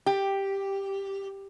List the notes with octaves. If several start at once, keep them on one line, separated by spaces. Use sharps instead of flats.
G4